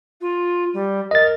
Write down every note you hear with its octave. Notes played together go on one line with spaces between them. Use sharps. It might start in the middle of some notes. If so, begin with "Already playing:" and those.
F4
G3
A#4 D#5 A6